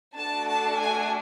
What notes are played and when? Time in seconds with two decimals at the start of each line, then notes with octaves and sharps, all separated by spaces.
0.16 A3 D4 F#4 A4 A5
0.48 A5
0.79 G#5